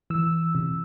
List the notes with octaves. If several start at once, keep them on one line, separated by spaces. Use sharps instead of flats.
E3 E6
C3